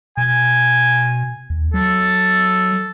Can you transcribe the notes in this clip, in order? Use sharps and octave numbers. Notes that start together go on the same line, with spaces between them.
B2 G#5
D#2
F#3 A4